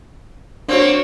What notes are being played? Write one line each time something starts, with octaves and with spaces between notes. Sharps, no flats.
A#3 C4 D4 F#4 C#5